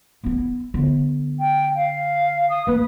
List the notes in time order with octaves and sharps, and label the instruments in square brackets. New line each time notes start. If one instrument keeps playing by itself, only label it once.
[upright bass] B3 E4
D3 B3
[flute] G5
F5
D#6
[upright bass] A#3 [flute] B4